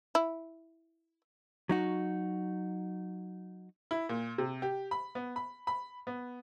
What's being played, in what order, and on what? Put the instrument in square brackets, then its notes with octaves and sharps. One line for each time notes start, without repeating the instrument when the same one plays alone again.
[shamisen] E4
[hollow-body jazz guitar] F#3 D#4 F#4
[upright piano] E4
A#2
C3
G4
B5
B3
B5
B5
B3